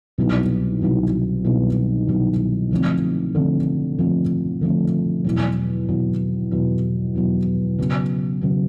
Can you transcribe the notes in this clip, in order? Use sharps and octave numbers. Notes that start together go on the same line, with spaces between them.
C2 B2 F#3 B3 D#4
C2 B2 F#3 B3 D#4
C2 B2 F#3 B3 D#4
C2 B2 F#3 B3 D#4
D3 F3 A3 C4
D3 F3 A3 C4
D3 F3 A3 C4
D3 F3 A3 C4
E2 B2 F#3
E2 B2 F#3
E2 B2 F#3
E2 B2 F#3
C#3 F#3 B3
C#3 F#3 B3